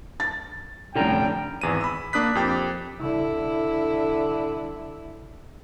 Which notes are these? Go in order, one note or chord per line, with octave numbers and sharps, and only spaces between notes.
A6
F1 A2 D3 C#4 G5 A#5
G#1 E2 D#7
B5 E6
A#3 D4 D#6 F#6 B6
F2 G4 G5 A6
D3 E4